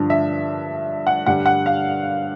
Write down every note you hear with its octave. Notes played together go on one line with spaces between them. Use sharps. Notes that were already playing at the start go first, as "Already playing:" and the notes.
Already playing: G2 D3 F3
E5
F#5
G2 D3 G3 F#5
F#5
F5